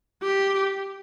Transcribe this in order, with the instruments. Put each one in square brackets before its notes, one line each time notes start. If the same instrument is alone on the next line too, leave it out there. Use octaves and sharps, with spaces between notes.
[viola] G4